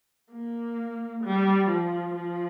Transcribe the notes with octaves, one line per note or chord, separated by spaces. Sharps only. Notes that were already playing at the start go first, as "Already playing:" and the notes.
A#3
G3
F3
F3